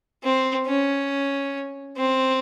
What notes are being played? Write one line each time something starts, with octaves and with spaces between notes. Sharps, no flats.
C4
C#4
C4